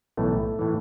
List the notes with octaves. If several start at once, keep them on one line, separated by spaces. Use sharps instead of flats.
B1 A2 E3 A3
A2 E3